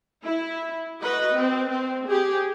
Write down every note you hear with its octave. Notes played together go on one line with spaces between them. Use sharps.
E4
F#4 B4 D#5
C4
C4
G4 G#4